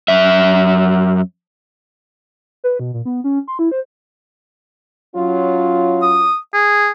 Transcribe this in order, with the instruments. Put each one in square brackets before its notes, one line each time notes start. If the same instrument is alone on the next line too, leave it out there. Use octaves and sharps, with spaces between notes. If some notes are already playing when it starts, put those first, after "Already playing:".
[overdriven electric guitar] F#2 E5
[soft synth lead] B4
B2
A#2
B3
C#4
C6
E4
C5
[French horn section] F#3 C#4 F4
[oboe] D#6
G#4